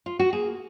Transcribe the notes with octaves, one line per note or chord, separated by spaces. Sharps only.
F4
F#4
A#3 G#4